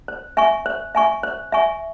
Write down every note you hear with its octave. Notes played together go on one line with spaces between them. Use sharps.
C5
E5 G#5 C#6
C5
E5 G#5 C#6
C5
E5 G#5 C#6